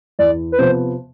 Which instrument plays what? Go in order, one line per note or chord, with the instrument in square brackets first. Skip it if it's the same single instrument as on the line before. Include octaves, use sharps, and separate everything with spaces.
[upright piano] E2 [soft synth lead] D5
[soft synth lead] B4
[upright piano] C3 F3 B3 [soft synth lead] C5